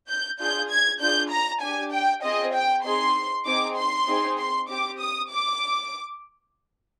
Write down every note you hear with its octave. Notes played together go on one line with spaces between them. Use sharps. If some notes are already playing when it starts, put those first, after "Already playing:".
G6
D4 F4 G#4 G6
G#6
D4 F4 G#4 G6
A#5
D4 G4 G#5
G5
C4 F4 G#4 D#5
G5
C4 D#4 G#4 C6
C4 D#4 G#4 D6
C6
C4 D#4 G#4
C6
C4 G4 D6
D#6
D6